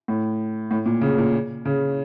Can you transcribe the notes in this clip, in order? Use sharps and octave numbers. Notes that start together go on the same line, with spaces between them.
A2
A2
A#2
C#3
A#2
C#3